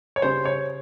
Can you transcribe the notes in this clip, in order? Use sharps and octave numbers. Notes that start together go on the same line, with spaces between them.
C#5
C#3 G3 C5
C#5